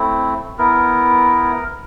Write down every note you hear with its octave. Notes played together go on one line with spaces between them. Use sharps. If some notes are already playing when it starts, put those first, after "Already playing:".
Already playing: A3 C4 E4
B3 E4 A#4